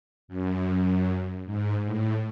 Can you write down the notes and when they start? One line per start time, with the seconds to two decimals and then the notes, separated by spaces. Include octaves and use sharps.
0.28 F#2
1.46 G#2
1.85 A2